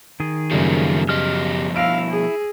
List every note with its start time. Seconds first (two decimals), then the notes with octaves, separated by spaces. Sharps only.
0.20 D#3 G#4
0.51 F#2 C#3 F3 G3 A3 A#3
1.09 B2 F3 G4 D#5 F6
1.76 E4 F5 E6 A#6 D7
2.10 G#4